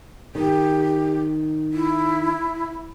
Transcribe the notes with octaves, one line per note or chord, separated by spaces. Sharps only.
D#3 G4
E4